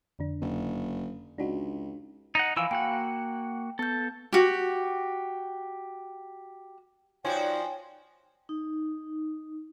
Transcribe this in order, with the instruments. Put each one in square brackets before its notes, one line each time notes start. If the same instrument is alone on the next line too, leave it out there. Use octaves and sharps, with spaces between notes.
[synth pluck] F2 D3 D4
[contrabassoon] F#1
[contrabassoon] C#2 [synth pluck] D4 D#4 F#4
[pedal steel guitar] D#4 D#5 F#5
[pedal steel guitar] E3 F3 E6 [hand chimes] F5 G#5 B5
[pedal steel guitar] A#3 F#4 F#5 [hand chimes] G5
[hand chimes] B3 G6 [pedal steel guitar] A4
[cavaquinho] F#4 G4
[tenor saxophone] F3 [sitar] D#4 F#4 D5 [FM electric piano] C#5 G#5 C6 [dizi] G5
[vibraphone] D#4